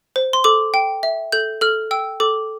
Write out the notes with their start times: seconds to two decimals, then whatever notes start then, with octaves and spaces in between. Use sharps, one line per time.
0.16 C5
0.33 C6
0.44 A4 D6
0.74 G5
1.03 E5
1.32 A4 G6
1.61 A4 F6
1.91 G5 E6
2.20 A4 D6